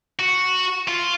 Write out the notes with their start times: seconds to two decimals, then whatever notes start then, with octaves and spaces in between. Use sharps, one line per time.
0.19 F#4
0.88 F4